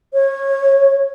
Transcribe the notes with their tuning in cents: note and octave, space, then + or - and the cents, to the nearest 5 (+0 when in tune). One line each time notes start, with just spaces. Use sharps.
C#5 -20